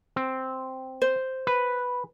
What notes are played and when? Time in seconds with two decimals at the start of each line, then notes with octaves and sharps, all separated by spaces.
0.16 C4
1.02 C5
1.47 B4